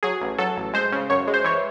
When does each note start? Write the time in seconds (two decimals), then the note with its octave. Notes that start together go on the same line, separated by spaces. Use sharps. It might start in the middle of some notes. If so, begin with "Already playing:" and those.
0.03 F#3 G#4
0.21 A1
0.38 F#3 A4
0.56 A1
0.73 G#3 C5
0.92 C#3
1.10 F#2 C#5
1.27 G#3
1.34 C5
1.44 E3 C#5